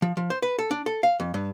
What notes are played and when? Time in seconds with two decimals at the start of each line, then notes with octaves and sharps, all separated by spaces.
0.02 F3
0.17 F3
0.30 C5
0.42 B4
0.59 A4
0.71 D4
0.86 A4
1.03 F5
1.20 F2
1.34 G2